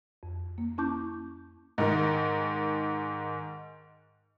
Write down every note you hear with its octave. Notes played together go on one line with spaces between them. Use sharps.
F2
A#3
C#4 E4 A5 C#6 D6 G6
G#2 D#3